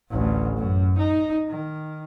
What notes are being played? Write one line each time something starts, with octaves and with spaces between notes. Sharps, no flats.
A1 D2
F#2
D#4
D#3